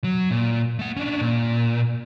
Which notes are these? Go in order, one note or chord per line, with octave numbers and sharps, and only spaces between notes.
F#3
A#2
A3 F#5
C#4 D4
A#2